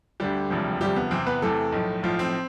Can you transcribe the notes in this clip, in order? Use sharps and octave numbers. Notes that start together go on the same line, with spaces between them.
D2 D3 G3 G4
E1 D2 C3 F3
E1 D2 C3 F3 G3 G4
B3
E2 C3 E3 C4
B3 B4
E2 C3 E3 A3 A4
B1 A2 F3
B1 A2 F3 F4
C4